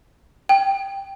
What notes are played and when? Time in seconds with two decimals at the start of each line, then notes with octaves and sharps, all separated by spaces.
0.49 G5